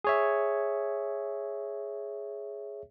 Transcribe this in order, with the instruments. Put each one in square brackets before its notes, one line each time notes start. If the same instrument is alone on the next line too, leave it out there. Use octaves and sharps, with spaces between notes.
[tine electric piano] G#4 C#5 E5